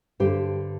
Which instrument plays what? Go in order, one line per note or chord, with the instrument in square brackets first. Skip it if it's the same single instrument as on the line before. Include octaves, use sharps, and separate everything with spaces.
[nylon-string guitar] G2 D3 G4 C5